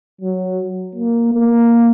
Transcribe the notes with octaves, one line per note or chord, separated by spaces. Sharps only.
F#3
A#3
A#3